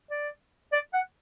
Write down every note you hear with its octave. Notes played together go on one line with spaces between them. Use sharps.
D5
D5
F#5